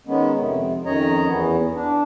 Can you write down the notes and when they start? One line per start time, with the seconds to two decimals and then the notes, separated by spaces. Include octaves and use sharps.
0.07 D#3 G#3 B3 C#4
0.39 F2 C3
0.85 F2 D#3 C#4 C#5 D#5 A#5
1.26 E2 E3 B3
1.75 D4